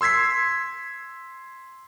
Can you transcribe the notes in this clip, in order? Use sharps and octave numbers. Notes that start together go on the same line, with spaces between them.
C6 E6 G#6 B6 C7